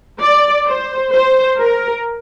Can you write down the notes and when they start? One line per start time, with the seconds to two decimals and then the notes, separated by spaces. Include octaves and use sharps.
0.21 D5
0.66 C5
1.13 C5
1.59 A#4